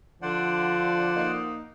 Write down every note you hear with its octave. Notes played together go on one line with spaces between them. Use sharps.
D3 F3 C5 D5 F#5
A#3 D#4